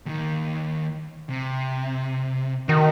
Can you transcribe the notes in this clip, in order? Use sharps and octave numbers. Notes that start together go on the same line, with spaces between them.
D#2 D#3
C3
D#3 F#4 A4